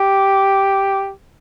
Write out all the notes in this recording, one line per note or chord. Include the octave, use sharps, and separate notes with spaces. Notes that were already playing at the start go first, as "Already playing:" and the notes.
Already playing: G4